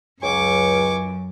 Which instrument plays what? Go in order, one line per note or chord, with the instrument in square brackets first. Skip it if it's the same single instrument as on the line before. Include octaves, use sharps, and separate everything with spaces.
[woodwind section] C#2 [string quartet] F#2 [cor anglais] G#5 [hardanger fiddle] C#6 D6